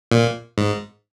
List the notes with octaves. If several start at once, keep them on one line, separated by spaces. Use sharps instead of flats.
A#2
G#2